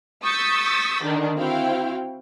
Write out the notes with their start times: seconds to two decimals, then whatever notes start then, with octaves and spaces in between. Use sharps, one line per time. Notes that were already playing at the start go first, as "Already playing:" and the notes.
0.23 C#6 D#6 E6 G6 A6 B6
1.03 D3 D#3 D4
1.37 C4 E4 F#4 F5 G5